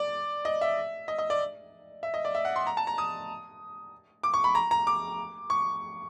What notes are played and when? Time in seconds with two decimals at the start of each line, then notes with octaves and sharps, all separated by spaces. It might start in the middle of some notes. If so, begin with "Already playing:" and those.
Already playing: D5
0.45 D#5
0.61 E5
1.08 D#5
1.18 D#5
1.30 D5
2.03 E5
2.14 D#5
2.25 D5
2.35 E5
2.45 F#5
2.56 C6
2.67 A#5
2.77 A5
2.87 A#5
2.98 D#6
4.23 D6
4.34 C#6
4.44 B5
4.55 A#5
4.71 A#5
4.87 D6
5.50 C#6